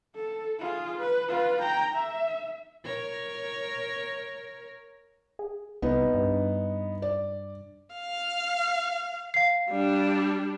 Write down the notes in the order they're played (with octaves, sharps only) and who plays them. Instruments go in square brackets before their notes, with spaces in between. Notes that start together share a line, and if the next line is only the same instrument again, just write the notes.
[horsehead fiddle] A4
F4 G#4
B4
F4 B4
G5 A#5
E5
[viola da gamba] A#4 C#5
[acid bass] G#4
[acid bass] C2 [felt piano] B3 D#4
[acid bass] G2
[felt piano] D5
[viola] F5
[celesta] F5 C7
[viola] G3 D4